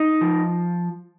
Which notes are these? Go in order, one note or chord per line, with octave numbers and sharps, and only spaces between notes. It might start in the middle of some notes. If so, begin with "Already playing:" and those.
Already playing: D#4
F3